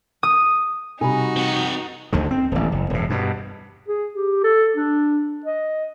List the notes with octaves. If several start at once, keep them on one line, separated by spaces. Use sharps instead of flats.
D#6
C3 G3 D#4 F#4 G#5 A#5 B5
C4 F#5
D2 D3 D#3
C4
D#1 A1
F#1
E1 A2
G2 B2
G#4
G4
A4
D4
D#5